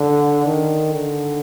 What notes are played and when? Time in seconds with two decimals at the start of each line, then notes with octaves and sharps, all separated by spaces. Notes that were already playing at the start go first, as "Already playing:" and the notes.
Already playing: D3
0.46 D#3
0.93 D3